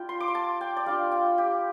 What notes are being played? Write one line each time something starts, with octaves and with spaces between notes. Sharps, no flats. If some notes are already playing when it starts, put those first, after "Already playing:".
Already playing: G3 F4 G5
C6
D6
C6
A5
G5
D5
G3 D4 F4 F5
G5
G4